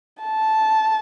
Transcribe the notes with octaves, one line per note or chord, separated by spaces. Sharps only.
A5